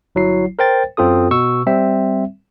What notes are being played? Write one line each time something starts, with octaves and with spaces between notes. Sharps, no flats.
G1 F#3 E4 C7
A#4 C5 G5 A6
F#2 C4 F4 A4 D#6
B2 C#6 E6
G3 C4 E5